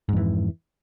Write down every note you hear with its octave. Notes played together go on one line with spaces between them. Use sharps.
F2 G#2 E3